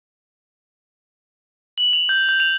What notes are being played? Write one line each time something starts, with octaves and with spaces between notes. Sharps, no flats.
F#7
F7
G6
G6
F7